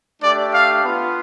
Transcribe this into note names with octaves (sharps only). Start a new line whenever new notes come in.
A3 D4 G4 D5
F5
B3 F4